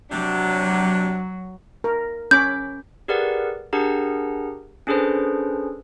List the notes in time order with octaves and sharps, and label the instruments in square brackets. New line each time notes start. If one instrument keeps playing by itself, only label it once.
[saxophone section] C3 D4 [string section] F#3
[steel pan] A#4
[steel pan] C#4 B5 D6 [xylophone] G6
[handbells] G4 G#4 A#4 B4 D5 F#5
D4 G4 G#4 A#4 F#5 A#5
C#4 D4 G#4 A4 B4 C5